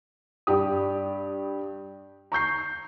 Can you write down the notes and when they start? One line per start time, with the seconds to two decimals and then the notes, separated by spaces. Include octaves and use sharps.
0.47 G2 G4 D#6
2.32 A#5 C#6 G6 C7